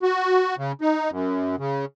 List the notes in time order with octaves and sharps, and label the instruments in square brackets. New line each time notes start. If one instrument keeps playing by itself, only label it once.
[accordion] F#4
C#3
D#4
F#2
C#3